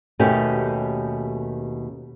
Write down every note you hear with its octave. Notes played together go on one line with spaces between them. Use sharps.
D#2 B2 A3 C#4 G4